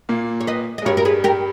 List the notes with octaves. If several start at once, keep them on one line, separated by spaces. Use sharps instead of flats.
A#2 A#3
C#5
B4 D#5
D#5
G#3
G2 G3 A#4 C#5
A#4
G#4 B4
G4 A#4